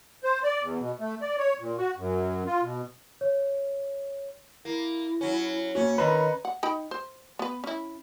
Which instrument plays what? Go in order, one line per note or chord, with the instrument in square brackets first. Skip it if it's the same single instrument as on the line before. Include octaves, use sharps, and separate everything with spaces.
[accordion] C5
D5
E2
B2
A3
D5
C#5
A#2
F#4
F#2
F4
B2
[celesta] C#5
[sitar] A#3 [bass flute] E4
[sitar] F#3 C#4
[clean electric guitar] A#3 F#4 [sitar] C#4 [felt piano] C#5
[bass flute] D#3 [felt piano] B4 A#5 [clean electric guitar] C#5 D#5 B5
[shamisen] F#5
D#4 G5 B5
C5
B3 B4
C#4 E4